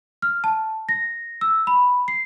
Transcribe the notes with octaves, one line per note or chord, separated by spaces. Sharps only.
F6
A5
A#6
E6
B5
C7